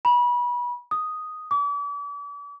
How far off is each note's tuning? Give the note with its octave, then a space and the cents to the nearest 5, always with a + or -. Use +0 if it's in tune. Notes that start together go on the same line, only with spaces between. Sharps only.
B5 -30
D#6 +0
D6 -40